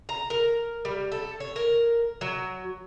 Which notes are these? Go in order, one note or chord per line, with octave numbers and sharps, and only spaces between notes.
A#5
A#4
G3
A4
C#5
A#4
F#3